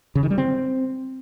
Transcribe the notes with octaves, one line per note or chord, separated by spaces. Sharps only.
C#3
D#3
G3
C4